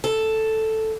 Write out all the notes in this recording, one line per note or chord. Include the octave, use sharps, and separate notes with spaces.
A4